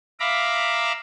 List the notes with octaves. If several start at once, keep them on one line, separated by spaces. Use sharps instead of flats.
E5 F5 A#5 B5 D6